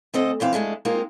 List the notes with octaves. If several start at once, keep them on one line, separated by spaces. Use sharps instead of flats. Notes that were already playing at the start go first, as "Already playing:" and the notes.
D2 C4 A4 D#5
F2 E3 C4 F5
F2 G#3 A3 D4
G#3 A#3 C4 D#4 F4 G4